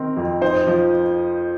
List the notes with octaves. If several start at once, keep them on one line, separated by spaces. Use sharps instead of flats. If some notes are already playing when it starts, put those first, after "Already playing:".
Already playing: D#3 C4 A#4
F2
D#4 C5
F3